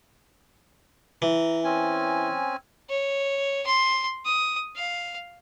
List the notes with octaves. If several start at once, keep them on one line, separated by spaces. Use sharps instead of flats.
E3 A#5
C4 C#4 G#5
C#5
C6
D#6
F5